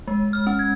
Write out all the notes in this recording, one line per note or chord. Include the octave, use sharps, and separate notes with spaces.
G#3
F6
C#4
G#6